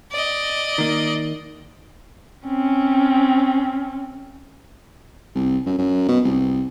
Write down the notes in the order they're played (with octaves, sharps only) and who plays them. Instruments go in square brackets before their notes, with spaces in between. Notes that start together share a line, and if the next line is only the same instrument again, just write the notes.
[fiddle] D5 D#5
[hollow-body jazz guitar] D#3 A#3
[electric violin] C4 C#4
[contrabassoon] C2
F#2
F#2
B2
C2